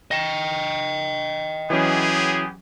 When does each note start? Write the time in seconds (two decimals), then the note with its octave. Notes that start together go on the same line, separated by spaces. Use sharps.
0.11 D#5 G5 A#6 E7
1.70 E3 F#3 B3 C#4 G4 G#4